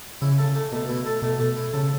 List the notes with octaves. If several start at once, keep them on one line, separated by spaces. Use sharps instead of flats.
C#3 E4
A4
A3
B2 A3
E4
A4
B2 A3
A3
E4
C#3 A4